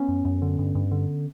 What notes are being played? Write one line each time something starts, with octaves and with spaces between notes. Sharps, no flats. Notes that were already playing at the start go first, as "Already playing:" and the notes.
Already playing: B3 C#4
F#2
F#2
D3
G2
G2
D3